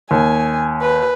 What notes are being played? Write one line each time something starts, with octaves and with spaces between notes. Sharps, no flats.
D#2 G#5
B4